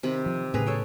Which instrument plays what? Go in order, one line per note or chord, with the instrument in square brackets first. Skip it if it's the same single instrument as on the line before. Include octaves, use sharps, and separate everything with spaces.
[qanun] C3 D#3 B5
[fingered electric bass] F3
[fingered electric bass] A2 C#3 [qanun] G#4 B4 A#5
[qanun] A4 C#5 G5